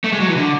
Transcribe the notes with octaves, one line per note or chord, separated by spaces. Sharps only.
A3
G#3
F#3
E3
D3